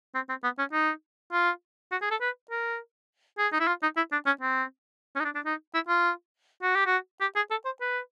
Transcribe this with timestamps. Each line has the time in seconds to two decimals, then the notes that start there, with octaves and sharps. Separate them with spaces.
0.15 C4
0.29 C4
0.44 B3
0.59 C#4
0.73 D#4
1.32 F4
1.92 F#4
2.01 G#4
2.11 A4
2.21 B4
2.51 A#4
3.38 G#4
3.53 D#4
3.60 E4
3.67 F4
3.82 D#4
3.97 E4
4.12 D4
4.26 C#4
4.41 C4
5.16 C#4
5.20 D#4
5.25 D4
5.35 D4
5.45 D#4
5.74 E4
5.88 F4
6.63 F#4
6.75 G4
6.86 F#4
7.21 G4
7.36 G#4
7.51 A4
7.65 C5
7.81 B4